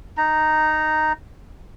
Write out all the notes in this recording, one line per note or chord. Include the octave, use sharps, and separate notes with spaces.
D#4 A#5